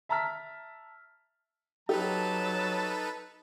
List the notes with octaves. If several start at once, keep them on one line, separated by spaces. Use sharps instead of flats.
E5 A5 A#5 E6 F6 B6
F#3 D#4 G4 A4 B4 A5